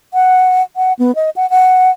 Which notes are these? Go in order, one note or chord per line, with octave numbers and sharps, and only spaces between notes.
F#5
F#5
B3
D#5
F#5
F#5